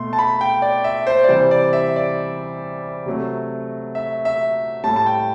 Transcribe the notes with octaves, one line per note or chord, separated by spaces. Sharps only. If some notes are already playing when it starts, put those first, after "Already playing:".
Already playing: B2 A3 C6
A5
B5
G5
D5
E5
C5
D5
C3 E3 G3 C5
D5
E5
D5
C3 F#3 A3
E5
E5
A2 G3 A5
A5
G5